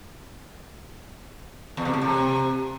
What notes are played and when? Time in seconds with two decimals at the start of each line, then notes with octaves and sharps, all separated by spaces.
1.77 E2
1.85 C3
1.93 A2
2.01 C3